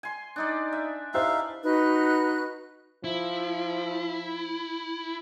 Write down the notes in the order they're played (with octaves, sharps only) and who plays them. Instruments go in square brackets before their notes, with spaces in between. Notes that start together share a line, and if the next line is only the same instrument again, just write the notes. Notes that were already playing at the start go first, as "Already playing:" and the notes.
[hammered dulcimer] G#5 C6
D4 D#4 D5
E5
[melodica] D#4 E5 F5 [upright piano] E4 G4 C5 [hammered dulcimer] B4
[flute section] D#4 F#4 B4 F#6
[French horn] F3 [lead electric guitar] E4